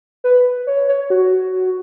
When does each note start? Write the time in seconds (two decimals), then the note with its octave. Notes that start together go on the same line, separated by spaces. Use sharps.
0.24 B4
0.67 C#5
0.89 C#5
1.10 F#4